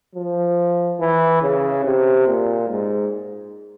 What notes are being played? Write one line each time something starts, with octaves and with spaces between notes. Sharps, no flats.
F3
E3
C#3
C3
A#2
G#2